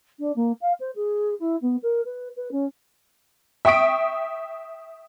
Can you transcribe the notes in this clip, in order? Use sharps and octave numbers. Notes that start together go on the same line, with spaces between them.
D4
A#3
F5
C5
G#4
E4
B3
A#4
B4
B4
C#4
E5 G5 C#6 D#6 B6 D7